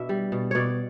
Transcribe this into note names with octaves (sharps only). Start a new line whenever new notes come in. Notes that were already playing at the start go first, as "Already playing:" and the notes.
Already playing: B2 D4 E5
G3
B2
B2 C#5 D5